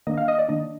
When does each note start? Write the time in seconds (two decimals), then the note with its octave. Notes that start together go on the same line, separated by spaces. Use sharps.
0.07 D#3 A#3 D4 D#5
0.17 F5
0.28 D#5
0.39 D5
0.49 D#3 A#3 D4 D#5